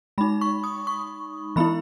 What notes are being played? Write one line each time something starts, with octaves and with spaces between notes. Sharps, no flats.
G#3 D#4 B5
C#6
D#6
C#6
E3 B3 E4 B5